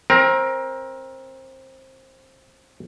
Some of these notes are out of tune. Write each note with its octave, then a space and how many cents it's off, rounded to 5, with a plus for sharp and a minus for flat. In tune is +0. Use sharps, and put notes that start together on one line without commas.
C4 +20 A#4 +20